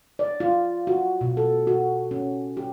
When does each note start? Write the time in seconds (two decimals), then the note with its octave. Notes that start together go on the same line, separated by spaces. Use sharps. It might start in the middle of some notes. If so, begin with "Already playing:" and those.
0.19 D5
0.40 F4
0.87 F#4
1.21 B2
1.37 A4
1.67 F#4
2.11 C#4
2.57 G4